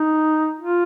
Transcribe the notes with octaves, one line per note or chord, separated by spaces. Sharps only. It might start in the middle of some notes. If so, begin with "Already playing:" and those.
Already playing: D#4
F4